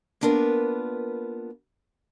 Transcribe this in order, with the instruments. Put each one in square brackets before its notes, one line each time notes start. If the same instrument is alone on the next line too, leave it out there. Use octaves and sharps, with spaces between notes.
[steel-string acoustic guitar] A#3 B3 D4 F4 A#4 B4